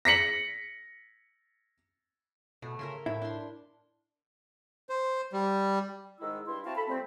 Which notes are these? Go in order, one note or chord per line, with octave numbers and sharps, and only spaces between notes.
A#6 B6 C#7 F#7
B2 A3
C#3 A#4 E5 C6
A2 E4 G5
D4 C6
C5
G3
G#2 D#3 G#3 E4 E6
G2 E4 C6
C4 E4 F#4 F5 A5
A4 B5
F3 G3 A3 C4